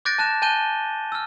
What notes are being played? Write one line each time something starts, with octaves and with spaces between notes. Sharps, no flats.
D6 F#6 G6 A6 A#6 D7
A5 F#6 E7
G#5 A5 F#6 G6 D#7 G7
E6 F6